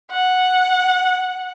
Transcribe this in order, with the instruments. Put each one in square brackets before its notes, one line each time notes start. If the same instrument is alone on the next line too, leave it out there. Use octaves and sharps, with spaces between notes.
[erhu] F#5